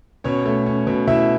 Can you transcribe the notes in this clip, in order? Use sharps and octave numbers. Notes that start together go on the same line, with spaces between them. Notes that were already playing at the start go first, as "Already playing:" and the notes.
B2 C#4 C#5
A3
C#4
B2
B2 E4 E5